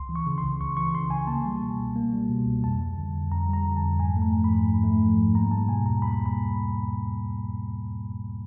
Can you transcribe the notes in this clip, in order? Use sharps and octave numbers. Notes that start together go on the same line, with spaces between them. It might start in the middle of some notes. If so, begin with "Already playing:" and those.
Already playing: C#2 C6
E3
C#6
C#3
C6
C#2
C#2 C#6
E3 C#6
C#3 C6
C#2 G#5
A#3 A5
G3
B2
C#2
A#3
G3
B2
C#2
F2 A5
G3
D3
F2
F2 A#5
G3 A#5
D3
A5
F2
G#2 G#5
A3
A#5
F3
B5
G#2
G#2
A3
F3
G#2
A#3 A#5
G3 A5
B2 G#5
E2 A#5
A#3 B5
G3
B5